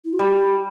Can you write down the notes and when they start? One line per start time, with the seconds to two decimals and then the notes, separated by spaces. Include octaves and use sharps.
0.05 E4
0.13 F#4
0.19 G3 G4